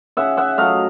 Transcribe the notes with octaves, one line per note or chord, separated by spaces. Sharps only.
C#3 E5 F#5
E5 F#5
F#3 A3 D#5 F5